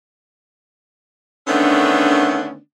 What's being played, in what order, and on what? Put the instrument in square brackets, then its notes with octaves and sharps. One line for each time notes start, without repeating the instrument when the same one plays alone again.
[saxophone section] D3 D#3 A3 B3 C#4 D4